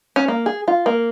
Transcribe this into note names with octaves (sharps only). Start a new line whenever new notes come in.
C#4
A#3
G#4
F4
A#3